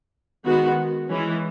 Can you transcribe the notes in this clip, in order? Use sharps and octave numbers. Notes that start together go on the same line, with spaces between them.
D#3 G#3 B3 F#4
E3 G#3 C#4